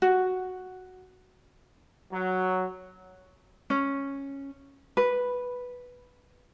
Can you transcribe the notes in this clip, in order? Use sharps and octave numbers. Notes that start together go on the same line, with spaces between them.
F#4
F#3
C#4
B4